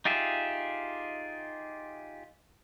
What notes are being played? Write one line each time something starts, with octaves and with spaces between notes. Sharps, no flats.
D#4 F4 G4 G#4 E5